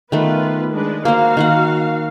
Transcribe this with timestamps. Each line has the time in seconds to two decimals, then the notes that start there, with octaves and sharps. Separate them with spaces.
0.12 D#3 A3 B3 F4 B4
0.71 G#3 D4 B4
1.05 A#3 F#4 C5 F5
1.37 D#3 A#3 F#5